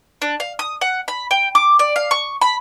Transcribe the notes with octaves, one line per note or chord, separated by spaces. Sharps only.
D4
F5
D#6
F#5
B5
G5
D6
D5
F5
C#6
B5